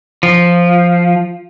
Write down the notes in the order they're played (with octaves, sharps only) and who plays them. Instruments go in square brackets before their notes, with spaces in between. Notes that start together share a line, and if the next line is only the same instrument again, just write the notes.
[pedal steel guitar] F3